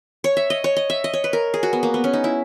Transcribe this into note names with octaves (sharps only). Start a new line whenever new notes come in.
C#5
E5
D#5
C#5
D#5
E5
D#5
C#5
B4
A#4
G#4
F#4
B3
A#3
B3
C#4
D#4
E4